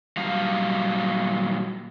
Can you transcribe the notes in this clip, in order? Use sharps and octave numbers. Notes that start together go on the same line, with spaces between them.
A#2 F#3 G3 F5